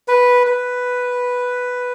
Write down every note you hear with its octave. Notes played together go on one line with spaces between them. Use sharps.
B4
B4